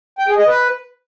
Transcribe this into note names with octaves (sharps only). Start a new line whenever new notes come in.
G5
G#4
D#5
B4